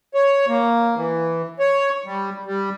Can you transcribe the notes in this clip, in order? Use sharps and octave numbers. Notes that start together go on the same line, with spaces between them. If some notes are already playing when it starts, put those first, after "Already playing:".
C#5
A#3
E3
C#5
G3
G3